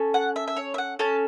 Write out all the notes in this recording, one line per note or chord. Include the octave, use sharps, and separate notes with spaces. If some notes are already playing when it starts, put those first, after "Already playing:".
Already playing: C#4 A4
F#5
E5
E5
C#5
E5
F#5
C#4 A4 A5